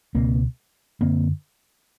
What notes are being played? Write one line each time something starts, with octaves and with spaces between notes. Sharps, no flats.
C#2 B2 A#3 C4
F#2 D3 A#3 C4